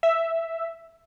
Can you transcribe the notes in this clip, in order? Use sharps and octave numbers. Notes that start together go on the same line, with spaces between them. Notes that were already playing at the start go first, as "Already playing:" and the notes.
E5